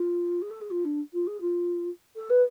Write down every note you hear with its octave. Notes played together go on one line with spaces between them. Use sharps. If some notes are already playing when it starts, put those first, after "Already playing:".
Already playing: F4
G#4
A4
G#4
F4
D4
F4
G#4
F4
A4
B4